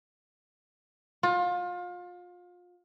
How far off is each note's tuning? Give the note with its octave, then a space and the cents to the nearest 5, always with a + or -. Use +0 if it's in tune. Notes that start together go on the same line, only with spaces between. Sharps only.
F4 +30